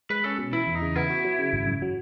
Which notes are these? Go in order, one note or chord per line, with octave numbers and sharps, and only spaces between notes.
G#3 B4
C#4 A4
B2
E3 E4
E2
D#4
C#3
B3 E4
F#4
F#3
C#3
G#1
F#2
F#3